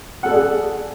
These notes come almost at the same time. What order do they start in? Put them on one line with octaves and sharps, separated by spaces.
F#5 A4 A5 D5 G#4